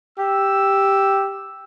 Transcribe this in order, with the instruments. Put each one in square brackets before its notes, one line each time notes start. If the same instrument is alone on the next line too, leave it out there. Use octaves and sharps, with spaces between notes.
[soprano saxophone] G4 [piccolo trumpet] E6